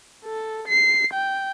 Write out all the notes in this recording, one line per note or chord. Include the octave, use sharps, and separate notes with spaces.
A4
C7
G5